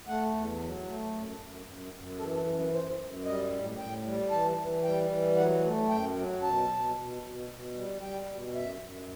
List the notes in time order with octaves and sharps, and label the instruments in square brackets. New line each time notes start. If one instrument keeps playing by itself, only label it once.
[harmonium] A3 F#5
E2
F#3
A3
F#2
F#2
F#2
F#2
E3 A4
A4
F#2
B4
F#2 C5
F#2
G3 D#5
A2
A2 G5
G3
E3 A5
E3
G3 G5
E3
F#3 F#5
A3
F#2 G5
F#3
B2 A5
B2
B2
B2
B2
G3
G3 G5
B2
F#2 E5
F#2